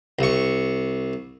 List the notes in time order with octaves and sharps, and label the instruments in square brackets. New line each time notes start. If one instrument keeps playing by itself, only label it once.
[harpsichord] C2 C#6